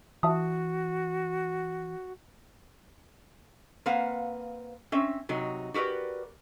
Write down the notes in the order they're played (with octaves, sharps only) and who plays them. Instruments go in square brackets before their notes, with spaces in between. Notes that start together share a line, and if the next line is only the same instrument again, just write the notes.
[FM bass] E3 [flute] F#4 [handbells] E5 A5 D#6
[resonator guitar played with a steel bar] A#3 C4 B4 F5 F#5
C4 C#4 E5
C3 F#3 D#4
F#4 G4 A#4 B4 D5